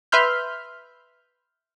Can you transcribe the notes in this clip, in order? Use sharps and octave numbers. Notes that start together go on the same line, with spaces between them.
B4 E5 B5 C6 F6 G6